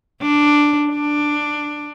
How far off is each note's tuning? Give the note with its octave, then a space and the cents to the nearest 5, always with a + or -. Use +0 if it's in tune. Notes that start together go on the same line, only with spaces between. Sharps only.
D4 +0
D4 +10